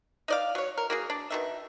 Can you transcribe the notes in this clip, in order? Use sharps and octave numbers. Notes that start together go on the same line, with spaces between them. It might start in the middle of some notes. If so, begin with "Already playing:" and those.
D#4 D5 F5
F#3 C#5
A#4
A#3 F#4 G#4
D4
B2 D#3 E5